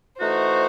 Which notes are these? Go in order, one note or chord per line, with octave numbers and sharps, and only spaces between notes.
E3 A3 D#4 F#4 C5